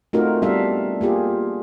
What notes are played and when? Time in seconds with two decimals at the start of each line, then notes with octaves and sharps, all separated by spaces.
0.13 A3 C4 D#4 F4 F#4 A#4
0.42 G3 B3 D4 A4 E5 F5
1.01 A#3 F4 G4 G#4